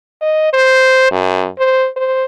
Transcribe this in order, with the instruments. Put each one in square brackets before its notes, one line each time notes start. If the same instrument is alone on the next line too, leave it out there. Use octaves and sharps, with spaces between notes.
[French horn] D#5
C5
F#2
C5
C5